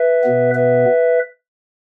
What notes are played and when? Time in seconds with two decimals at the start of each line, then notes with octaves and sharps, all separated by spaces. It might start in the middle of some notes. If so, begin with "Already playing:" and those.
Already playing: B4 E5
0.24 B2 B3
0.55 B4 E5